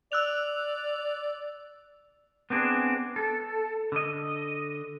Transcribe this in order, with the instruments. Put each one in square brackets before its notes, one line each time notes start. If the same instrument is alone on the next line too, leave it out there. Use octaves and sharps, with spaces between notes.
[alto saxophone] D5 [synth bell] E6 F#6 F7
[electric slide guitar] B3 C4 D4 G#4
A4
D3 D#5